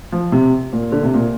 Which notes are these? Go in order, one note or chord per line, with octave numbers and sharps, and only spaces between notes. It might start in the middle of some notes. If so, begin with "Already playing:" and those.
F3
C3
A#2
D3
C3
A#2